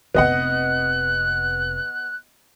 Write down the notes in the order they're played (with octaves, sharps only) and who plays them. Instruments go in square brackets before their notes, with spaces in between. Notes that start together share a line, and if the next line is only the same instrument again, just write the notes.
[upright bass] F1 C3 [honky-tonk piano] B3 D#5 F#5 [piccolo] F#6